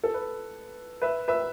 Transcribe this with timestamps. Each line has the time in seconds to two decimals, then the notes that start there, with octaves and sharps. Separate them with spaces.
0.04 A4
0.14 B4
1.02 B4 E5
1.28 B4 E5